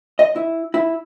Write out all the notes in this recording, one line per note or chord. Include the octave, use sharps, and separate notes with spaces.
D#5
E4
E4